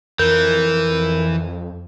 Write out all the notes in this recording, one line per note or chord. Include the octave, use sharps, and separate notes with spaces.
F2 E3 A#4 G6